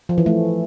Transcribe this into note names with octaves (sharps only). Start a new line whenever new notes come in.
F3
E3
A3